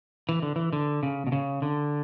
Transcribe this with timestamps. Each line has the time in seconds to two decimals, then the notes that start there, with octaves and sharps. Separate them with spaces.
0.29 E3
0.43 D3
0.56 E3
0.73 D3
1.03 C#3
1.27 B2
1.32 C#3
1.62 D3